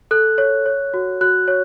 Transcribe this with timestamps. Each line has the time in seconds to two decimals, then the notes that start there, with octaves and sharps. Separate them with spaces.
0.11 A4 F#6
0.38 C#5
0.66 C#5
0.94 F#4
1.21 F#4 F#6
1.48 C#5